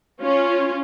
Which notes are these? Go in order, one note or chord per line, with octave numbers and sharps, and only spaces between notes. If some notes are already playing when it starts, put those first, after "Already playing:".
C#4 F4